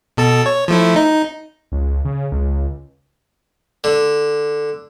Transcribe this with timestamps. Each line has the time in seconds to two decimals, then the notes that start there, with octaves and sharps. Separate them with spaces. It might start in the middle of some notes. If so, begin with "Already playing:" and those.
0.17 B2 A4 A5
0.46 C#5
0.68 F3 A3 E4
0.96 D#4
1.72 C#2
2.05 C#3
2.32 C#2
3.84 D3